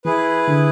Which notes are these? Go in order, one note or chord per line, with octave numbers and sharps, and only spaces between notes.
E3 E4 G#4 B4
D3